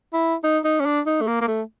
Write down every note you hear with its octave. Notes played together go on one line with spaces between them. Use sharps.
E4
D#4
D#4
C#4
D4
D#4
A3
A#3
A#3
A3